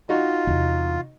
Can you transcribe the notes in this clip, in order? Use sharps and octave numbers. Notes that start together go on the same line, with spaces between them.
D#4 F4 F#4 D#5
E2 C3